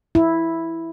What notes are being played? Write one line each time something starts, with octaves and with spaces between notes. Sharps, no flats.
E4